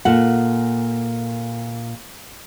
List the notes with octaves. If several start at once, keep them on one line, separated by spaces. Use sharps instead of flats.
A#2 A4 F#5